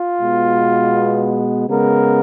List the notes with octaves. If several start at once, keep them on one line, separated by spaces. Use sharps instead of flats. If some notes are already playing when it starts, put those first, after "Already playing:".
Already playing: F4
B2 G#3 B3
C#3 G#3 B3 A#4